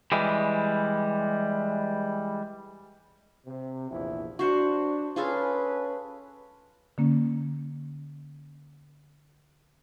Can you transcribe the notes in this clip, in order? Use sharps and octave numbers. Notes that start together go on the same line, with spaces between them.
E3 G3 G#3
C3
A#1 E2 E4
D4 F#4 C5 F#5
C#4 F4 G#4 A4 B4
D3 A#3 C#4